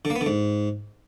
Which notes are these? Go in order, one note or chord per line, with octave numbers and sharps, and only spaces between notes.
D3
A#3
B3
D3
G#2